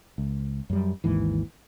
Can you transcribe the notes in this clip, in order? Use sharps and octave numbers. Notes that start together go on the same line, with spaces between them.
C#2
F#2 G3
G#1 D#2 G#2 E3